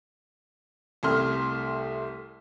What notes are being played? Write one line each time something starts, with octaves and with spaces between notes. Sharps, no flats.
C2 C3 A3 C6 F6